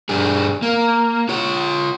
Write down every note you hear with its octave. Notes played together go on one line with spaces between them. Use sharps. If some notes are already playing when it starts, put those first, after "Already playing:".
G2 D4 G#4
A#3
F4 C#5